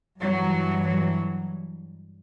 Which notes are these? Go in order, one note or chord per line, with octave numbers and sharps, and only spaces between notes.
G2 E3 F#3
F#3